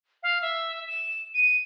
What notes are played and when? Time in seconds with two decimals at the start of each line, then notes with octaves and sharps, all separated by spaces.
0.23 F5
0.42 E5
0.87 E7
1.34 D#7